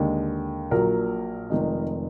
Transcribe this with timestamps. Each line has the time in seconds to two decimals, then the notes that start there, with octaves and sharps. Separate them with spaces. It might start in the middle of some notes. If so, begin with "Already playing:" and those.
Already playing: D#2 D3 G#3
0.71 A#1 A#2 F#3 A#4
1.50 F1 F2 D#3 G#3